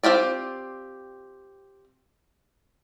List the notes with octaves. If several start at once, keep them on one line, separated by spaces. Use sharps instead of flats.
C4 F4 G4 D5